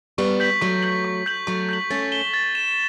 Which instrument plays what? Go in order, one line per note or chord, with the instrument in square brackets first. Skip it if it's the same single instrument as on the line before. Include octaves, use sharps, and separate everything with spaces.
[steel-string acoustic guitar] G3 B3 [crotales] C#6
[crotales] G6 B6 F#7
[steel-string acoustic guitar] F#3 A3 [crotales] C#6
[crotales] G6 B6 F#7
C#6
G6 B6 F#7
[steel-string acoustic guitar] F#3 A3 [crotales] C#6
[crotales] G6 B6 F#7
[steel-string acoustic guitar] A3 C#4 [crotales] A6
[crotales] E7 G7
A6
E7 G7